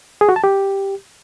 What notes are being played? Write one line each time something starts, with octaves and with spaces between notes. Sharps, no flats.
G#4
F#4
A5
G4